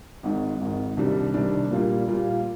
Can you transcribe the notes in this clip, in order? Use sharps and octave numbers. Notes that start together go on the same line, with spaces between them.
G#1 G#2 D#3
G#1 G#2 D#3
C2 C3 D#3 G3 D4
C2 C3 D#3 G3 D4
A#2 G3 A#3 F4
A#2 G3 A#3 F4